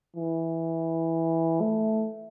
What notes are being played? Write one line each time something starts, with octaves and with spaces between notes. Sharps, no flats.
E3
A3